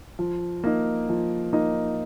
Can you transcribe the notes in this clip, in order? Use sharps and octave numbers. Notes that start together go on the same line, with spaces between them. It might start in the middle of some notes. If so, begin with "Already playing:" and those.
F3
A#3 D#4
F3
A#3 D#4